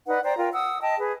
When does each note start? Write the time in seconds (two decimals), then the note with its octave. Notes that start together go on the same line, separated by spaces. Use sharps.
0.07 D#4 B4 D5 F#5
0.23 C5 D5 G5 A#5
0.37 F4 A#4 G5
0.53 F#5 D#6 E6
0.81 D#5 G5 A5
0.98 G#4 B4